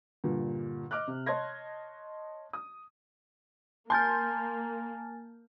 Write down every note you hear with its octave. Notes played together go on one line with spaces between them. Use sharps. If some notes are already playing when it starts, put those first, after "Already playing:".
G2 A#2 D3
D#5 D6 F6 F#6
C3
C#5 D#5 A5 C6 G#6 A#6
D#6
A#3 G#5 A5 C6 F6 G6 A6